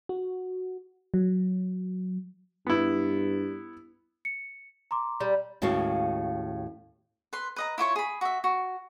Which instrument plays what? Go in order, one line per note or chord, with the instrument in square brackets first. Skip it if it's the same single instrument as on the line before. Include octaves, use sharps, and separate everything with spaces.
[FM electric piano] F#4
F#3
[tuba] G2 [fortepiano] B3 E4
[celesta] C#7
A#5 C6 D6
[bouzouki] G3
[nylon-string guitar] D#2 A2 G#3 C#4 F#4 F5
[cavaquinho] B4 C6
B4 D#5 A#5
E4 F4 C#5 C#6
G#4 B5
F#4 E5
F#4